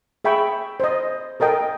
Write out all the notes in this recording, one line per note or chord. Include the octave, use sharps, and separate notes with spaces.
G#4 E5 G5 B5 C#6
C5 D#5
A4 A#4 D#5 G5